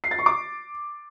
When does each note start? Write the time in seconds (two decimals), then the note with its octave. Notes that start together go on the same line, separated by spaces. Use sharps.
0.04 C7
0.11 A6
0.19 C#6
0.26 D6